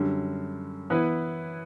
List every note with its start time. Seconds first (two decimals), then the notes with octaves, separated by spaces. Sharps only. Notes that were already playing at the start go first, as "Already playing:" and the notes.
Already playing: F#2 D3 G3
0.90 E3 B3 E4 B4